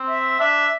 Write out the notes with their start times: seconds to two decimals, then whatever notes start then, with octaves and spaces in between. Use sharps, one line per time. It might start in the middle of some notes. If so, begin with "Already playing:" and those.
Already playing: C4
0.09 E5
0.40 D4 E5